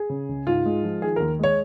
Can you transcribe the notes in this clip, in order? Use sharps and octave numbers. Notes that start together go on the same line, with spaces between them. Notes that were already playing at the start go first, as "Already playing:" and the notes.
Already playing: G#4
C#3
C#2
G#2 F4
G#3
F3
D#3 G#4
D#2 A#4
G#3 C#5